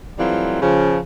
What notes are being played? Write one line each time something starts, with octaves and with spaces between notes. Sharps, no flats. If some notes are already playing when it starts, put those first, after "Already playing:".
E3 F#3 G3 A3 C4 F4
C#3 F3